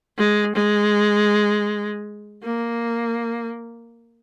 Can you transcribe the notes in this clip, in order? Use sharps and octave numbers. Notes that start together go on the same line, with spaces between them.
G#3
G#3
A#3